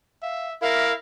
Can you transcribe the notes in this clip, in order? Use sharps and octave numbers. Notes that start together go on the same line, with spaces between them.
E5 F5
E4 A#4 E5 F5